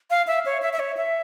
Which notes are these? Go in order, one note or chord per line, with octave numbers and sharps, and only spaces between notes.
F5
E5
C#5
E5
E5
C#5
E5